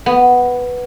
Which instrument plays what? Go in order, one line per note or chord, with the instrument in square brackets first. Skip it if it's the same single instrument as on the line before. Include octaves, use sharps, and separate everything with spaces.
[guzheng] B3